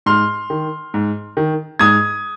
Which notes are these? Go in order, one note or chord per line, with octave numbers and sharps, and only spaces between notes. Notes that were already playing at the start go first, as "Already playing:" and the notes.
G#2 C6 F6
D#3
G#2
D#3
G#2 D#6 G#6